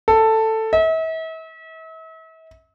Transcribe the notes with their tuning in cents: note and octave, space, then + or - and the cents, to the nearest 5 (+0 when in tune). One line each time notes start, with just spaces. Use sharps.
A4 +10
E5 -40